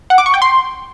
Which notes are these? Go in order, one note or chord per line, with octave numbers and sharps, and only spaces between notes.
F#5
D6
C#6
G5
C6